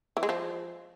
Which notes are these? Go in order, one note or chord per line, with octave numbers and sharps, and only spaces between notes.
E3
G#3
F3